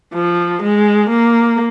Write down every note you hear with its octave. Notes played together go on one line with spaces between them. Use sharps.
F3
G#3
A#3